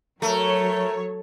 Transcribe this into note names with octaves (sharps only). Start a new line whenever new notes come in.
F#3 A3 A#4 C#5